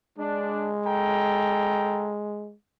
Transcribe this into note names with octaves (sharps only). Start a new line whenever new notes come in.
G#3 D4
A4 G5 A#5